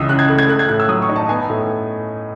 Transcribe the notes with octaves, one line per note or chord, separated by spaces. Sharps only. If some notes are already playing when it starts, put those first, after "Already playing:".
Already playing: C#2 E3 D#6 E6
C#3 F#6
G#6
A3
G#6
A3 F#6
G#6
A2 F#6
E6
F#3 D#6
C#6
D#4
A5
B3 G#5
A2